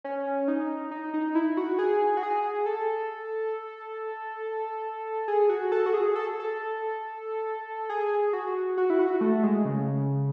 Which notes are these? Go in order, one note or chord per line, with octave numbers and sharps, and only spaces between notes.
C#4
D#4
D#4
D#4
E4
F#4
G#4
F#4
G#4
A4
G#4
F#4
A4
F#4
G#4
A4
A4
G#4
F#4
F#4
E4
F#4
A3
G#3
C#3